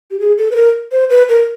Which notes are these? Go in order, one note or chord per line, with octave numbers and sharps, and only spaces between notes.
G4
G#4
A4
B4
A#4
C5
B4
A#4